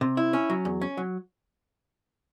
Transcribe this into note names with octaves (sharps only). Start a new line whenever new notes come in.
C3
E4
C#4
F#3
E2
C#4
F#3